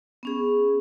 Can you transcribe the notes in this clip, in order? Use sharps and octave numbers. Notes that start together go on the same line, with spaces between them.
B3 C#4 G#4